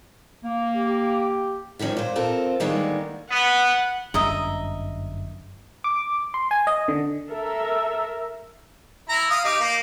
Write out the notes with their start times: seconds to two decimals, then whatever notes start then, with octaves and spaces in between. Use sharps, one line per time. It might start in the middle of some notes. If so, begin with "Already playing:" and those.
0.44 A#3
0.76 G4
1.79 D3 D#3 F3 C#4 D#4
1.97 A#2 C5
2.16 C4 F4 A4 A#4 C5
2.60 D3 D#3 G3 G#3 A#3 B3
3.31 B3 F#5
4.14 G1 F#2 D4 D#5 E5 A#5
5.84 D6
6.34 C6
6.51 G#5
6.67 D#5
6.88 D3
7.31 A4 A#4 E5
9.09 E4 A#5
9.30 F5 D#6
9.44 D#4 G4
9.60 A#3